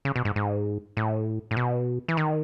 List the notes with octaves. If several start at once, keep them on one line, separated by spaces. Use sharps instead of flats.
C#3
B2
G#2
G#2
A2
A2
B2
E3
D#3